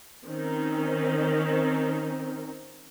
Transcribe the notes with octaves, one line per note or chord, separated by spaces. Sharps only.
D#3 C4 C#4 D#4